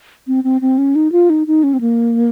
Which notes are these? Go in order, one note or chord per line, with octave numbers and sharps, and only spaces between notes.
C4
C4
C4
C#4
D#4
F4
D#4
D#4
C#4
C4
A#3